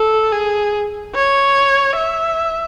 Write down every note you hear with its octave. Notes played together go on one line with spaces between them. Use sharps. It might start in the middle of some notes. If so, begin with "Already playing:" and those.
Already playing: A4
G#4
C#5
E5